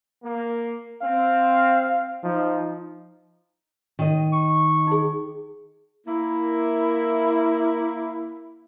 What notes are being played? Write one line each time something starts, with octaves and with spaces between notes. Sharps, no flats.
A#3
C4 F5
F3 D#4
D#3 D#5
C#6
D#4 G#4
A#3 E4